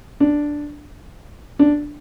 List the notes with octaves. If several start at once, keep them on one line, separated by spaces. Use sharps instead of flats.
D4
D4